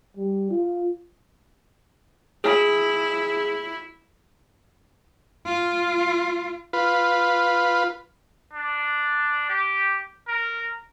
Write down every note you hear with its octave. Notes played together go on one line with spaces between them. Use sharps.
G3
F4
E4 G#4
F4
F4 B4
D4
G4
A#4